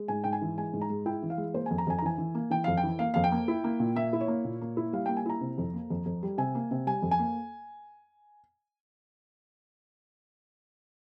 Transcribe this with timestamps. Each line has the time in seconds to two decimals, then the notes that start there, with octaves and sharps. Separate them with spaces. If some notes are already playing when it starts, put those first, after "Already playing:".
Already playing: G#3
0.08 G#2 G#5
0.24 G#2 G5
0.33 G#5
0.42 E3
0.57 G#3 G#5
0.73 G#2
0.81 A#5
0.90 G#3
1.06 E4 G5
1.23 E3
1.30 F5
1.37 G#3
1.54 A#3 C5
1.66 F2 G#5
1.78 A#5
1.87 F2 G#5
1.99 A#5
2.02 E3 G#5
2.18 E3
2.35 A#3
2.50 E3 G5
2.64 F2 F5
2.77 G5
2.84 E3
2.99 A#3 F5
3.14 F2 F5
3.24 G5
3.32 A#3
3.48 E4
3.64 A#3
3.80 A#2
3.96 A#3 E5
4.13 E4
4.21 C#5
4.28 A#3
4.45 A#2
4.61 A#3
4.77 E4
4.93 G3 F5
5.06 A#3 G5
5.17 G#5
5.26 E4 A#5
5.41 C3
5.58 F2
5.74 A#3
5.90 F2
6.06 F2
6.23 G3
6.38 C3 G#5
6.55 A#3
6.71 C3
6.86 G3 G#5
7.02 F2
7.11 G#5
7.19 A#3